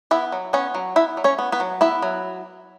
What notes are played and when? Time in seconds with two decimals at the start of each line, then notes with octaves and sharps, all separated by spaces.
0.11 B3 E4 E5
0.32 F#3
0.53 B3 C#4 C#5
0.75 F#3
0.96 B3 E4 E5
1.17 F#3
1.24 C#4 C#5
1.39 B3
1.52 B3 B4
1.60 F#3
1.81 B3 E4 E5
2.02 F#3